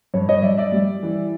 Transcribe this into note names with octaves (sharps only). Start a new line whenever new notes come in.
G2 C#5
C#5 D#5
G2 D5 E5
D5 E5
G3
E3